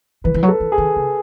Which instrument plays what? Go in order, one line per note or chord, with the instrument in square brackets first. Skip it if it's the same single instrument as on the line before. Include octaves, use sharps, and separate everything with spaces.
[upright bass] E3 [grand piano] B4
[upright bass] E3
F#3
[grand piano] A4
[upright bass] E3
[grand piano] G#4
[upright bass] D#3
C#3